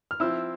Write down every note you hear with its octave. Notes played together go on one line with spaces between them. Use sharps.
F6
F3 C4 E4 E6